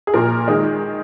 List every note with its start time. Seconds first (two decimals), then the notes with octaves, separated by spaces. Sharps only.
0.07 G#4
0.14 A#1 A#2 F3 A#4
0.48 D#3 G#3